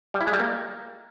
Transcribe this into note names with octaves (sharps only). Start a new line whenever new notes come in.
G3
E4
G#3
G3
A#3